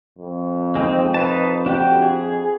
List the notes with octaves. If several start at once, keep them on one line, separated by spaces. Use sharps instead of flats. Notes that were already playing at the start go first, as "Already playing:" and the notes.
F2
G#3 C4 D#4
D#4 B4 A5
D4 F#4 G4
G#4